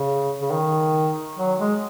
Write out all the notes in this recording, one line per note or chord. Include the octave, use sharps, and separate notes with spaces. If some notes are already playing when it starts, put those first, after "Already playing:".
Already playing: C#3
C#3
D#3
F#3
G#3